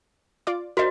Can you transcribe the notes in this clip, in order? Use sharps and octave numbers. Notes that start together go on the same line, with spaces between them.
F4 D5 D6
F#4 A#4 C5 D5 D#5